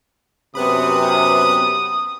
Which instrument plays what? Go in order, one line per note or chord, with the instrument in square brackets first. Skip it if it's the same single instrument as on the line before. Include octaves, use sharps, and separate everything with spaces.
[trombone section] F#2 C3 [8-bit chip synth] B3 B4 B5 [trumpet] D#6